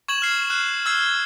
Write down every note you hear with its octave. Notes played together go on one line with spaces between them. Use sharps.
C#6 G#6 E7 F#7
F6 C7
F6 F#6
E6 G#6 C7